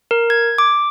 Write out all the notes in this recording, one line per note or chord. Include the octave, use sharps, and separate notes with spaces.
A#4
G#6
D6